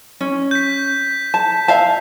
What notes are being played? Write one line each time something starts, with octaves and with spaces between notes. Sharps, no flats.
C#4
G6 B6
A5
E5 F5 A5